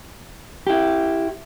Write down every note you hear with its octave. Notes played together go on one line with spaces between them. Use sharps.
E4 G4